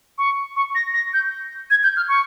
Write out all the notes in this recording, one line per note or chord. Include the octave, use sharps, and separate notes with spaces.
C#6
C#6
A#6
A#6
G6
G#6
G6
F6
C#6